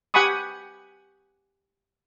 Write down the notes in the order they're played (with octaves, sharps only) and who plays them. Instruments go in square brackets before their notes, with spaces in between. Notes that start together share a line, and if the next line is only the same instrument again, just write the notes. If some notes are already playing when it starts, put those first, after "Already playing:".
[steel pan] G4 F#5 G#5 B5 C#6 D#6